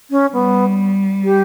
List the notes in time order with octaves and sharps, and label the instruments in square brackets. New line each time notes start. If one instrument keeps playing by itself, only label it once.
[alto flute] C#4
[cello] G3 [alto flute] B3
[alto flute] G4